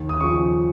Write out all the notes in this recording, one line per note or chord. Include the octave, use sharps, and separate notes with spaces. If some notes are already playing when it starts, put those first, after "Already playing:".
Already playing: D#2
D#6
C#3 F3 C#6